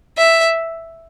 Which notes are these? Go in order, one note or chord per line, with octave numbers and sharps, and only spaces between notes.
E5